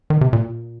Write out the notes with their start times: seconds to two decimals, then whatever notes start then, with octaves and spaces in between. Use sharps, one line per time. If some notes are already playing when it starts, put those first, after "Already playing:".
0.10 D#3
0.21 C3
0.33 A#2